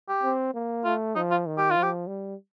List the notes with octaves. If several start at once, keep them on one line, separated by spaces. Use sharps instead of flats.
G4
C4
A#3
A3 F4
F3 D#4
F4
D#3
G4
F4
F3
G4
G3